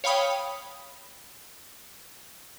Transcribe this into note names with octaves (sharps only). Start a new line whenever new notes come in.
C#5 F5 G5 B5 D#6